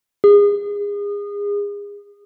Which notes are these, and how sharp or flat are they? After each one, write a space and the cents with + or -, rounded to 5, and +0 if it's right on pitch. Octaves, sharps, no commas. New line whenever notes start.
G#4 -30